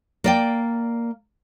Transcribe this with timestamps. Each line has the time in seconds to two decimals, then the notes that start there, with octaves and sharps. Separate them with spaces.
0.24 A#3 D5 G5